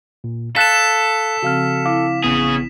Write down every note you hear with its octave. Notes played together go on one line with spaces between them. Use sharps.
A#2
A4 F5 F#6 A6 B6 E7
C#3 F3 C4 F#4 F5 F6
E4 F5 D6
A1 C#3 B3 G#4